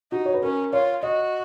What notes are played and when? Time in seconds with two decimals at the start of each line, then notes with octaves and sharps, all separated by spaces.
0.12 D#4 F#4
0.26 C#5
0.34 B4
0.42 C#4 A#4
0.73 F4 C#5
1.03 F#4 D#5